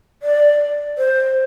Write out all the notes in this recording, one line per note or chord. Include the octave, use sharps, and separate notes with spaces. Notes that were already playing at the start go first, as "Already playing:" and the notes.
D5
C5